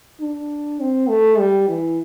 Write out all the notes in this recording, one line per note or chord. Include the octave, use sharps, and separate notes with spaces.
D4
C4
A3
G3
E3